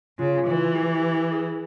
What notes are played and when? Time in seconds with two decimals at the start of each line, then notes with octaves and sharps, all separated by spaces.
0.19 C#3 F4
0.46 E3
0.75 G4
1.32 G#4